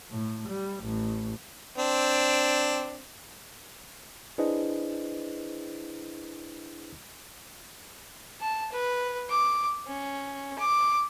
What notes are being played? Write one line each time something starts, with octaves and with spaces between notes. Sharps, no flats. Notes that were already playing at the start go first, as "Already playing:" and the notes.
A2
G3
A1
C4 D4
D4 E4 G#4 B4 C5 D#5
A5
B4
D6
C#4
D6